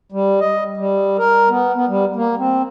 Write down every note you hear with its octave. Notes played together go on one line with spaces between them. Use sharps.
G3
D#5
G3
A#4
B3
B3
G3
A#3
C4